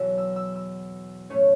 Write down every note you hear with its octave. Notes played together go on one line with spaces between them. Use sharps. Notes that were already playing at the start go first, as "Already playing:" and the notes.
Already playing: E2 B2 F#3 E5
E6
E6
E6
A2 A3 C#4